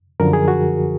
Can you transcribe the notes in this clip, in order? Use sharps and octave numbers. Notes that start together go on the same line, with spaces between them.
F#2 D3 F3 A#4
G#4
F#4